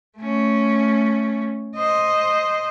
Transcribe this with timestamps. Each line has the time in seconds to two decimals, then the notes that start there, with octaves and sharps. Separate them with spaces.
0.18 A3 C#4
1.76 C5 D#5